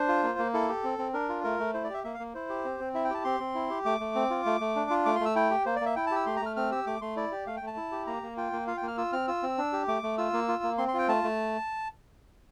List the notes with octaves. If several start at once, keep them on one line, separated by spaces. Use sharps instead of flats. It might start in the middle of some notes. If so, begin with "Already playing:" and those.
Already playing: D4 C5
F4
A#3
A#3
E4 A4
G4
C4
C4
D4 A#4
F4
A3 A#4
A3
E4 C5
D5
G4 E5
A#3 E5
F5
A#3
E4 C5
G4
C4
C4
E4 E5
G5
G4 A5
C4 C6
C4
E4
G4
A3 D6
A3
C4
F4
A3
A3
D4
F4
A3 D6
C6
A3 E6
E4 G5
G4
A#3 C5
D5
A#3 E5
E4 G5
A5
G4 E6
A3 C6
A#5
A3 F6
C4 F6
G4 E6
A3 D6
A3 C6
E4 D5
G4
A3 F5
G5
A3
A5
E4
G4
A#3 A#5
A#3
F4 G5
A#3
F4 F5
G5
A#3
F6
F4 E6
C4 F6
F4 E6
C4
D4
G4
A3 D6
A3
F4 E6
A#3
F4
A#3
C4 C6
C6
F4 G5
A3 A5
A3